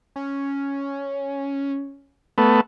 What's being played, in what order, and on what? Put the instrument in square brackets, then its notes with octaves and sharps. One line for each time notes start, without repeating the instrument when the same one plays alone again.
[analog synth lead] C#4
[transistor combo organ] A3 B3